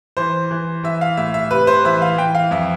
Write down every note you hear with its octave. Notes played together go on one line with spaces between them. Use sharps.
E3 C5
E3
E3 E5
F5
A2 E5
E5
C3 B4
C5
E3 E5
F5
E3 G5
F5
F2 E5